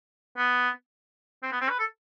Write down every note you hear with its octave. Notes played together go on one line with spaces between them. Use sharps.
B3
C4
B3
C4
B4
A4